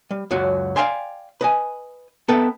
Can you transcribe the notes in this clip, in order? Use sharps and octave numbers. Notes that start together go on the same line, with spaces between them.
G3
C#2 F#2 F#3 F#4
D5 E5 F5 G5 G#5 C6
B4 D#5 G#5
B3 A4 B4 E5 G5 A5